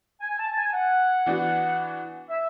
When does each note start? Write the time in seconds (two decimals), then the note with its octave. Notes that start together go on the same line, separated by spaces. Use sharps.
0.21 G#5
0.38 A5
0.56 G#5
0.73 F#5
1.26 E3 B3 D4 F#4
2.30 E5